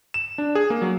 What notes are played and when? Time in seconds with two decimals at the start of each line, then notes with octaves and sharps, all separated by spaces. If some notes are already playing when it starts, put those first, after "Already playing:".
0.14 E7
0.38 D4
0.55 G#4
0.70 A#3
0.82 F#3